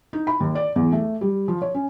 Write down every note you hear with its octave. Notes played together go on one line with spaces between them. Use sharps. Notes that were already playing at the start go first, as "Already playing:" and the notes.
D#4
B5
D#2
D5
E2
A3
G3
F3
C#5
C#4